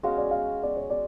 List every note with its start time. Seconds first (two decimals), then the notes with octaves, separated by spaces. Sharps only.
0.03 G#3 C#4 F#4 F5
0.18 D5
0.31 F5
0.63 D5
0.77 C#5
0.90 D5